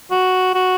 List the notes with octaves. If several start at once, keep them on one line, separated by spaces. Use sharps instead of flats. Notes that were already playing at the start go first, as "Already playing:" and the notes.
F#4
F#4